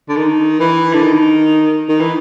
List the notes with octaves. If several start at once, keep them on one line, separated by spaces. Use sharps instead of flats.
D3
D#3
E3
D3
D#3
D#3
E3